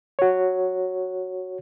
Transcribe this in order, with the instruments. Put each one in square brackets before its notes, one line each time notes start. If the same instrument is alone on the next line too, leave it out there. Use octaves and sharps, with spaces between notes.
[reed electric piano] F#4 C#5